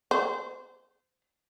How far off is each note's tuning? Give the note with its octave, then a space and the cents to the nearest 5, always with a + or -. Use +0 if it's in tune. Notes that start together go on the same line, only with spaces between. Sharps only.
C5 -30